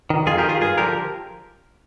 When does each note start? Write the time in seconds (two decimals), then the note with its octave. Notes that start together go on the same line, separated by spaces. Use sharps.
0.10 D#3
0.27 F2 F4 G#4
0.38 G4 A#4
0.44 D#3
0.49 F4 G#4
0.61 G2 F4 G#4
0.78 D3 F3 G4 A#4